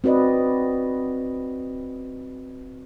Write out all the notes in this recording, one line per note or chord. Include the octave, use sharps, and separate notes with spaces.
C4 F#4 B4 D5 D#5